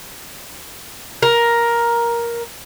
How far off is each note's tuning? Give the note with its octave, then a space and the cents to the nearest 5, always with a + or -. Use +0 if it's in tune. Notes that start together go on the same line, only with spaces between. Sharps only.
A#4 +10